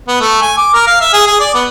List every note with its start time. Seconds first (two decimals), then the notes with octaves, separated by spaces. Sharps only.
0.08 B3
0.21 A3
0.42 G#5
0.58 D6
0.74 A#4
0.87 F5
1.01 E5
1.13 G#4
1.27 G#4
1.40 D5
1.54 B3